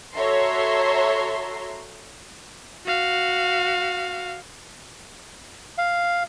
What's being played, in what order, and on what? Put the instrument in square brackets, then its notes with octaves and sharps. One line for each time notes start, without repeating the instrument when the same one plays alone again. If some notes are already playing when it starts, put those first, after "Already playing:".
[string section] F#4 A4 C#5 E5 A#5 C6
[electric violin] F#4 F5
[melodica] F5